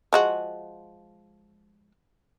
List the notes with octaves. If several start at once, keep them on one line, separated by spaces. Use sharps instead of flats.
F3 G#3 F#4